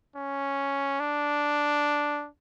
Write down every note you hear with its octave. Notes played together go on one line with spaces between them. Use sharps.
C#4
D4